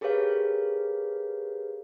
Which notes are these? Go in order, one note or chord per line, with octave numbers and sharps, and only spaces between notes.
G4 G#4 A#4 B4 C#5 F5